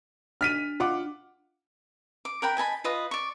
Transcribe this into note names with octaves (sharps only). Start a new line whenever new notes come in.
D4 F6 B6 D#7
F4 F#5 D6
D6
A#4 F#5 G5 B5
D#5 G#5 A5 B5
F4 B4 D#5 D#6
D5 C#6